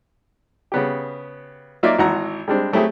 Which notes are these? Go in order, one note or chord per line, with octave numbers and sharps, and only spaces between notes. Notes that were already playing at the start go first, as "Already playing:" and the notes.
C#3 B3 G4
F#3 A#3 D#4 F4 D5 E5
G#1 E3 F#5 A#5
G3 G#3 C4 D4
F#3 A3 C4 E4 G4 G#4